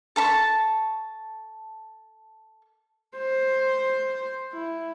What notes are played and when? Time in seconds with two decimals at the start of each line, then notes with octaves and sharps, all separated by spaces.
0.16 A4 A5 B5 C#6
3.18 C5
4.53 E4